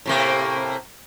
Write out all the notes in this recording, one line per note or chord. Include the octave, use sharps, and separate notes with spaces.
A2 C3 A#3